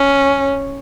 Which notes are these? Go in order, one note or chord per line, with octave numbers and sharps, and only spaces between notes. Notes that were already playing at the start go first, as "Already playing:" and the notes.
Already playing: C#4